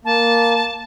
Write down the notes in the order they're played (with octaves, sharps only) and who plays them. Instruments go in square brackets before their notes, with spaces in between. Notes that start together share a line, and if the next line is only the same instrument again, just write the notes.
[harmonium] A#3 [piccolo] A5